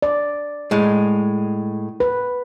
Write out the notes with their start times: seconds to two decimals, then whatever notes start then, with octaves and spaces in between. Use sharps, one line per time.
0.02 D5
0.71 A2 G#3
2.00 B4